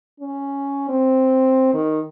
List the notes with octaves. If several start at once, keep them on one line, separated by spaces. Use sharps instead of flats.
C#4
C4
D#3